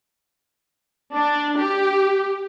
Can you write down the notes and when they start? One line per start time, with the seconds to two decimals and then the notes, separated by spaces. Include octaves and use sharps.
1.13 D4
1.57 G4